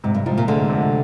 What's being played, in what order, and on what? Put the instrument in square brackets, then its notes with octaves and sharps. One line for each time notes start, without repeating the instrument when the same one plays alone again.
[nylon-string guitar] G#2 [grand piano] C3
[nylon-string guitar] G2
[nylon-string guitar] G#2 [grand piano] F3
[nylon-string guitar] A#2
[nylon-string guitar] D2 D3 [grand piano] G#3
[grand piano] C3